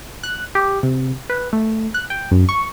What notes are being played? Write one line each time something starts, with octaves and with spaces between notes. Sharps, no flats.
F#6
G4
C3
B4
A3
F#6
G5
F#2
C#6